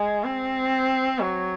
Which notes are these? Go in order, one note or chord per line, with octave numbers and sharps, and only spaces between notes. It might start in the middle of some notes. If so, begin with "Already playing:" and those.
Already playing: G#3
C4
F#3